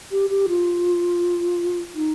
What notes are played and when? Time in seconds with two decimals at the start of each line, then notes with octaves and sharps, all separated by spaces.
0.12 G4
0.30 G4
0.49 F4
1.95 D#4